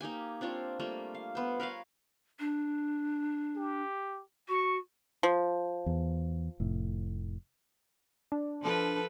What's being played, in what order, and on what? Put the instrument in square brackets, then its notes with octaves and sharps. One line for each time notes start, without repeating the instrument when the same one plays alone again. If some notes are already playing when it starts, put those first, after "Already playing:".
[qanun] A#3 D#4 G4 G#5
C4 D4 F4 C#5
G3 A3 A#3 F4
F5
B3 C5
A#4 B4 C#5 F5
[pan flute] D4
[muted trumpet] G4
[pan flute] F#4 [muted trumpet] C#6
[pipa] F3
[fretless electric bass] E2
F1 A2
[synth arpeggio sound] D4
[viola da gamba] F3 A4 B4